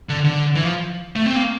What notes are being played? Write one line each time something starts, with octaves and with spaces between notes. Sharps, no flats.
D3
D3
E3
F3
A3
C4
A#3